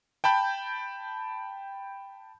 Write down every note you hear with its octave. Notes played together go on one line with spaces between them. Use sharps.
G5 A5 B5 G6